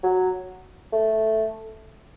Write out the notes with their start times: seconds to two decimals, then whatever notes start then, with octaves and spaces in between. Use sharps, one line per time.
0.03 F#3
0.93 A3